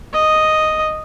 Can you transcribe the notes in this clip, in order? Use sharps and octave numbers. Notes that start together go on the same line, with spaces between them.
D#5